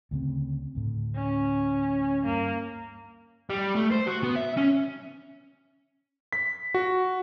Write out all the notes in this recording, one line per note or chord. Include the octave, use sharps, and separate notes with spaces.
D2 C#3 C4
D2 A2
C#4
G2 A#3
G3
A3
C5
F#4
B3
E5
C#4
B6
F#4